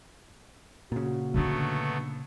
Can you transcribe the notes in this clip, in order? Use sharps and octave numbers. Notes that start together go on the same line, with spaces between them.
A#2 C#3 F#4
D3 F#3 A3 B3 D4